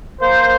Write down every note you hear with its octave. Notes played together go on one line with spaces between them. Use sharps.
A#3 C5